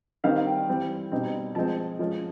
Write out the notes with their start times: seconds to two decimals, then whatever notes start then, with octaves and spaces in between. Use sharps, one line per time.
0.24 D#3 G3 C4 D#4 F5
0.47 G5
0.67 E3 G3 C4
1.11 B2 G3 C4 D#4
1.55 F3 G#3 C4 A5
1.99 F3 G#3 C#4